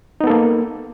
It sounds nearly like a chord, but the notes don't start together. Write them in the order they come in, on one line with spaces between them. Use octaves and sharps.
D#4 B3 A4 A#3